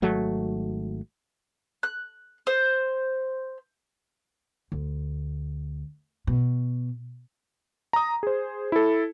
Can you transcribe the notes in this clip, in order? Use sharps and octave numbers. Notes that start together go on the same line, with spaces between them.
G#1 F#3 A3
F#6
C5
D2
B2
A#5 D#6
G#4 C5
E4 A4